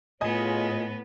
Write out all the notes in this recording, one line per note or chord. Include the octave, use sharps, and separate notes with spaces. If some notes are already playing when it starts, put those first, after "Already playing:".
A2 B3 F4 G#4 C#5 D#5 G#5